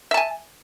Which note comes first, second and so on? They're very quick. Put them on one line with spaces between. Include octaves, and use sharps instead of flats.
E5 A5 G#5